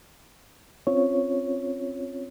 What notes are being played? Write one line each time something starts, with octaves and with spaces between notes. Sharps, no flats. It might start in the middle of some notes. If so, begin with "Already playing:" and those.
C4 C#4 F4 C#5